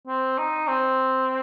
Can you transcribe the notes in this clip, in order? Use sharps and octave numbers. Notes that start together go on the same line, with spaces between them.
C4
D#4
C4